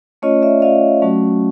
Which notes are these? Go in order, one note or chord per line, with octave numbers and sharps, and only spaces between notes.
A3 C#4 F4 C#5 D#5
D5 E5
A3 C#4 F4 D#5 F5
F#3 A3 C#4 F#4